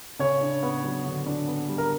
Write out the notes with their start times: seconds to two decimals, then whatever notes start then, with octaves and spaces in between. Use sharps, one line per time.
0.19 C#3 C#5
0.41 D4
0.63 B3
0.83 F#3
1.05 D3
1.26 D4
1.48 B3
1.69 G3
1.78 A#4